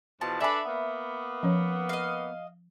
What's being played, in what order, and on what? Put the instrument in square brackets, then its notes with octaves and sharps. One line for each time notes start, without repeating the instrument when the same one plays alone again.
[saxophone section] E2 B2 F3 [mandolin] A5
[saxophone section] D4 A4 B4 [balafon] D5 G#5 [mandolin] E5 B5
[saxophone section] A#3 B3
[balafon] F3 C#4 C#5
[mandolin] D#5 F5